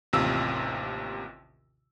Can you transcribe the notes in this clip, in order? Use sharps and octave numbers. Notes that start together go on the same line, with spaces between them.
A1 D#2 C3 F4 E6